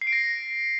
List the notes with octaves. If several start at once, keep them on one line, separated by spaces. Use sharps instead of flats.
C7
D7
A#6